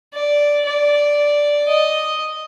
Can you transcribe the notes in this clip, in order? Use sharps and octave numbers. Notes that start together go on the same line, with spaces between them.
D5
D5
D#5